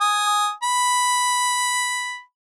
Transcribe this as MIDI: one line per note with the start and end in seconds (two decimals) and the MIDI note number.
0.01 0.52 80
0.01 0.52 87
0.63 2.21 83